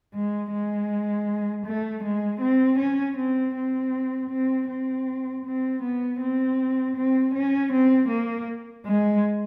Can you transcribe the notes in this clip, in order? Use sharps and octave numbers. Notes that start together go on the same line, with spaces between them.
G#3
G#3
A3
G#3
C4
C#4
C4
C4
C4
C4
C4
B3
C4
C4
C#4
C4
A#3
G#3